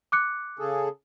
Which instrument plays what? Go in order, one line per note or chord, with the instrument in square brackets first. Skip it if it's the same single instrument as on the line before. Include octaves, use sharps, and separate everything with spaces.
[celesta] D6 F#6 C#7
[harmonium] C#3 G#4 A4